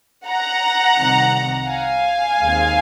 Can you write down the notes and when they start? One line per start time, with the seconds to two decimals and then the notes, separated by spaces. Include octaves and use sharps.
0.28 F#5 A#5
0.99 C2 C3 D#3
1.70 F5 G#5
2.41 D#2 D#3 G#3 C4 D#4